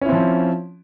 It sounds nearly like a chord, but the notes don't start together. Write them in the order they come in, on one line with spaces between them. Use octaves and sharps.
C#4 E4 C4 F3